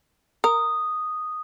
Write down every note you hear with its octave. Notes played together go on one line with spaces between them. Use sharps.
A#4 D#6